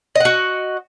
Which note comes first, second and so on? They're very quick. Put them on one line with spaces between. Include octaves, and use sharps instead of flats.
D#5 F#5 F#4